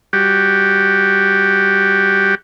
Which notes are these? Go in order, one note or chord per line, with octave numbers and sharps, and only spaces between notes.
G3 F#4 G4